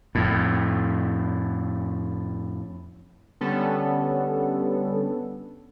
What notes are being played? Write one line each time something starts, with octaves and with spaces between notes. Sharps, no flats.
F2 A2
D3 G3 B3 C#4 A4